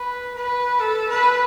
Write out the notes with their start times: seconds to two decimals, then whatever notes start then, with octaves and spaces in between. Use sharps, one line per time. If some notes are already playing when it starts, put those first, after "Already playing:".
Already playing: B4
0.35 B4
0.80 A4
1.09 B4